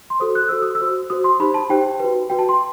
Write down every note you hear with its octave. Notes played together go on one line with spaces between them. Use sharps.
C6
F#4 A4 C5 D#6
F#6
F#4 A4 C5 E6
D#6
E6
F#4 C5
F#4 C5 D#6
C6
D#4 G4 C5 B5
A5
D#4 G4 C5 G5
F#4 B4
F#4 B4 G5
A5
C6